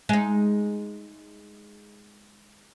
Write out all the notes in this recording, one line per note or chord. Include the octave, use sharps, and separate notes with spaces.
G#3 D#4